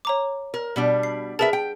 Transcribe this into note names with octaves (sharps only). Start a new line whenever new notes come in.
C#5 A#5 D6
A#4
B2 G3 D4
C7
G#4 A#4 B4 E5 A5 A6
G5